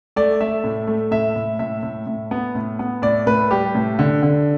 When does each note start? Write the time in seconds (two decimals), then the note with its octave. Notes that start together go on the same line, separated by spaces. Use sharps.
0.16 A3 D5
0.41 A3 E5
0.64 A2
0.87 A3
1.11 A2 E5
1.36 A2
1.59 A2 E5
1.83 A2
2.07 A2
2.31 B3
2.55 A2
2.79 B3
3.02 A2 D5
3.26 A2 B4
3.51 G3 G4
3.75 A2
3.99 D3
4.23 D3